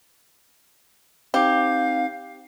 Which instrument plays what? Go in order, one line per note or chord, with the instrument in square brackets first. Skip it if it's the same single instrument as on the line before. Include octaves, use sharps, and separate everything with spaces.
[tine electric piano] C4 D#4 [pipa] G4 [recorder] F5